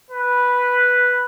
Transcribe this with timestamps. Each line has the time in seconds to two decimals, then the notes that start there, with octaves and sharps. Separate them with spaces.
0.10 B4